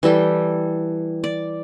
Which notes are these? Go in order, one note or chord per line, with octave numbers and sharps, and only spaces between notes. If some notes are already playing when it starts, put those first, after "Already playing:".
E3 G3 A4 G5
D5